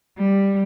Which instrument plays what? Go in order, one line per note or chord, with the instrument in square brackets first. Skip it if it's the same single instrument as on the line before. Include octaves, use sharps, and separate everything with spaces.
[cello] G3